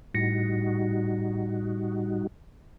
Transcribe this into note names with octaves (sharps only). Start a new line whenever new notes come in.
A2 G3 D#4 F#4 A#6 C#7